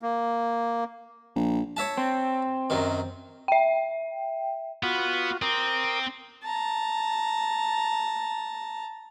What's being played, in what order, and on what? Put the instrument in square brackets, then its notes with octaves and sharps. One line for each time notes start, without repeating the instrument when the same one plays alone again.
[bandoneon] A#3
[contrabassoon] A#1
[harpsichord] C#5 E5 A5
[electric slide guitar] C4
[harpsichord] F#2 D#3
[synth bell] E5 G5
[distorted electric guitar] B3 [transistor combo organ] F4 F#4
[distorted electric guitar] C4 [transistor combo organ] A#4 D6 D#6
[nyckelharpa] A5 A#5